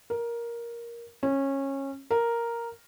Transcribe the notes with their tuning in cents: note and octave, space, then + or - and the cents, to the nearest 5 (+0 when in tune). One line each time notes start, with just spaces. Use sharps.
A#4 +10
C#4 -20
A#4 +0